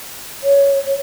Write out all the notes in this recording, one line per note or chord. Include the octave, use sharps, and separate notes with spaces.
C#5